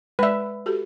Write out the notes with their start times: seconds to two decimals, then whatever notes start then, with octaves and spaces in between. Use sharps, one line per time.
0.19 G#3 B4 D5 E5
0.66 F#4 G4 A4